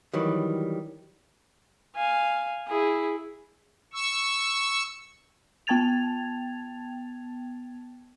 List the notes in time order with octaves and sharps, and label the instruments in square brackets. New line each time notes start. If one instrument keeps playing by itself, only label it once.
[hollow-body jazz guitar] D#3 E3 F#3 G3
[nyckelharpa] F5 G#5
E4 G#4
[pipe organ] C#6 E6
[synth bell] B3 G5 A5 G#6 A6 F7